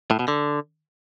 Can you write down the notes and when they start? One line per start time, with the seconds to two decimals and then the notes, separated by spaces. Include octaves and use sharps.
0.11 A2
0.19 B2
0.28 D3